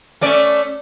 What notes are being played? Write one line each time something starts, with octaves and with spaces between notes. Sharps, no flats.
A3 C#4 D5